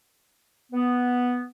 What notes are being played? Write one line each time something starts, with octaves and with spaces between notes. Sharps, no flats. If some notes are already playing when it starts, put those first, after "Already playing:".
B3